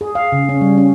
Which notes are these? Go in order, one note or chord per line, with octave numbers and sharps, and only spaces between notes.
G#4
F5
C#3
C#4
G3
C#4